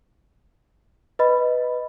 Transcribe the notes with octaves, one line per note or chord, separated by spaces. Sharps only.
B4 D#5 B5